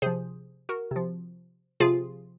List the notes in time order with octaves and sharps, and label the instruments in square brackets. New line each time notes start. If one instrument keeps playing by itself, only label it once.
[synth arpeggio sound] C3 F3 G#4 C5
F#4 A#4
C3 F3
C3 F3 F4 G#4